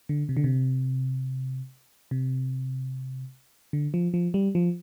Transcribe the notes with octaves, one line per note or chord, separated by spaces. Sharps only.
D3
C3
D3
C3
C3
D3
F3
F3
G3
F3